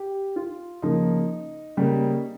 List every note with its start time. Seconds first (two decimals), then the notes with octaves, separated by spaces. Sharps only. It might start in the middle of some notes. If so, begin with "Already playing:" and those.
Already playing: G4
0.36 F4
0.82 C#3 F3 A#3 D#4
1.77 C#3 G3 A#3